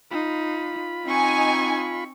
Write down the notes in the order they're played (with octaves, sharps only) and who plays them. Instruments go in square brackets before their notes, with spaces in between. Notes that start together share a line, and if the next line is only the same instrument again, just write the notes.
[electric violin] D#4 [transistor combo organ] F4 B5
[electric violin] C4 C#6 [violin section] D#4 G#5